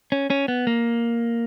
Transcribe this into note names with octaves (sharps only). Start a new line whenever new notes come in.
C#4
C#4
B3
A#3